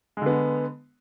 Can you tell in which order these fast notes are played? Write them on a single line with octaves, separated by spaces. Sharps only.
G#3 D3 B3